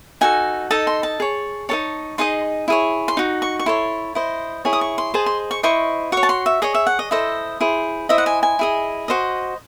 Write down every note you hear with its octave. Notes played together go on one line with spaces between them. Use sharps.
D#4 F#4 A4 G#5
D#4 A4 D#5 A5
C6
A5
G#4 C#5
D#4 A4 C#5 A5
D#4 G#4 D#5 C6
E4 G#4 C#5
C6
D#4 F#4
C#6
C#6
E4 A4 C#5 C6
E4 C5 D#5
E4 G#4 C#5
D#6
C#6
C6
G#4 C5 D#5 A5
C6
C#6
E4 C5 D#5 C#6
F#4 C#5 C#6
A5
C6
E5
G#4 C#5 D#5
E5
F#5
D#5
E4 A4 C5 D#5
E4 G#4 C5
E4 C5 D#5 E5
F#5
G#5
G#5
E4 G#4 D#5
F#4 C5 D#5